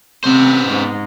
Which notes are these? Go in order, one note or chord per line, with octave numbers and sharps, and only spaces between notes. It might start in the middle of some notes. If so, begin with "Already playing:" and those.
C3 B3 C5
G#2